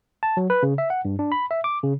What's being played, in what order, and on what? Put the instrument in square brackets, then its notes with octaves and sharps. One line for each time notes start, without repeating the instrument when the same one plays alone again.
[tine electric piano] A5
F#3
B4
C#3
E5
F#5
G2
D4
B5
E5
D6
C#3